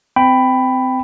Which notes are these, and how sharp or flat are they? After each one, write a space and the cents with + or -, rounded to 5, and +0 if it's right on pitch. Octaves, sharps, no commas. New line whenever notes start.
C4 -25 G5 +0 B5 +10